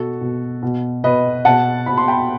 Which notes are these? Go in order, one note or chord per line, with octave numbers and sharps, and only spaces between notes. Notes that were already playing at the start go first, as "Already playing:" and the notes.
Already playing: B2 F#4 A4
B2
B2
B2 B4 D#5
B2 F#5 A5
B2 B5
C6
G5 B5